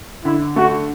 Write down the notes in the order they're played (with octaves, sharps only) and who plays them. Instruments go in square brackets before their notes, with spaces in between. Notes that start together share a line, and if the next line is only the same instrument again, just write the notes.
[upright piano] D3 [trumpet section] E4
[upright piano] A3 [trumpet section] F#4